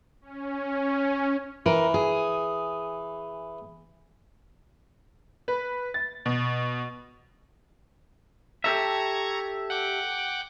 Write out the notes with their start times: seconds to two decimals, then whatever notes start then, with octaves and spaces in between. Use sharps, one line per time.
0.21 C#4
1.66 E3 A#4
1.94 G#4
5.48 B4
5.94 A6
6.26 B2
8.64 G4 A4 E5 A#5 C#6 G#6
9.70 F#5 G5 D6